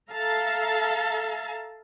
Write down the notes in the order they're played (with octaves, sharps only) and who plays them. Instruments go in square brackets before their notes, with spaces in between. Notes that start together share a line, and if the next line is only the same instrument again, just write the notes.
[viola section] A4 E5 F5 A5 A#5